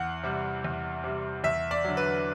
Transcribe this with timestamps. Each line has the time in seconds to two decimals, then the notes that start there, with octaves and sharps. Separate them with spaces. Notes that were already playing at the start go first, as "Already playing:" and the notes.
Already playing: E2 F#5
0.23 C3 G3
0.64 E2
1.04 C3 G3
1.44 E2 E5
1.71 D5
1.84 D3 F#3
1.97 B4